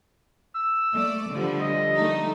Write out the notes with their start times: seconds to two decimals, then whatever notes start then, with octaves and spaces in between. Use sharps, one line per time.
0.55 E6
0.95 A3 D5
1.31 D3 F3 G3
1.61 D#5
1.96 G3 A3 D#4